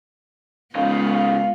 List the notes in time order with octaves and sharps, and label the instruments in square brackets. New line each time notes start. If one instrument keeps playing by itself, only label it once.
[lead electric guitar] C#3 D#4 [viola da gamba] G#3 B3 F4 [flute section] F5